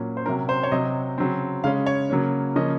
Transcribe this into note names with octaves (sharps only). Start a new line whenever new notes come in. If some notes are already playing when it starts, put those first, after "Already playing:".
Already playing: A#2 F#3 C#4
C5
C3 F#3 C#4 A#4
C5
C#5
C3 F#3 C4 D#5
C#3 F#3 C4
C#3 G#3 C#4 F5
C#5
C#3 F#3 A#3 C#4
C#3 F3 A#3 C#4 D#5